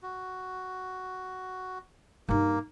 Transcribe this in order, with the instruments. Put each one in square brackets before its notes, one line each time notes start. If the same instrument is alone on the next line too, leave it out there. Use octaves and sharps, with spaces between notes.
[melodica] F#4
[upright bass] G2 D#4 [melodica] A#3